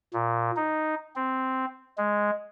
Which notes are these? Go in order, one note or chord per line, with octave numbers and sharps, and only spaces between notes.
A#2
D#4
C4
G#3